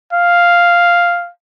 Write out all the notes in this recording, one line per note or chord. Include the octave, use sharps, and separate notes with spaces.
F5